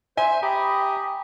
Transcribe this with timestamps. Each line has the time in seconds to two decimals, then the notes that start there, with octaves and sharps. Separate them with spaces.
0.17 C5 E5 G#5
0.43 G4 A#5 B5 D#6